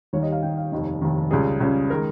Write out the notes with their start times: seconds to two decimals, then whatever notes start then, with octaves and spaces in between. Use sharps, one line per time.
0.13 D#2 D#3 G3 C#5
0.23 D#5
0.32 F5
0.42 D#2 D#3 G3 G5
0.57 F5
0.72 F1 D#2 D#3 D#5
1.02 F1 D#2 D#3
1.31 C#2 C#3 G3 G#4
1.60 C#2 C#3 G3
1.90 D#3 G#3 A#4